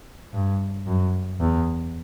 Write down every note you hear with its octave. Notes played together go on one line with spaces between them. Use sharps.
G2
F#2
E2